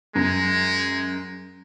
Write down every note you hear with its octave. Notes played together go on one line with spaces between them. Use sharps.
F#2 G#3